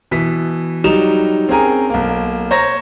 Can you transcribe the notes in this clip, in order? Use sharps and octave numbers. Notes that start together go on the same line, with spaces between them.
B2 E3 B6
F#3 G3 D#4 E7 F7
C4 C#4 G#4 A#4 G#5 A#5
B1 A#3
C5 C#5 A#5 A#6